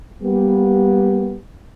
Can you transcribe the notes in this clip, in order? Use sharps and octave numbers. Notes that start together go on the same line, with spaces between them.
G3 A#3 B3 G4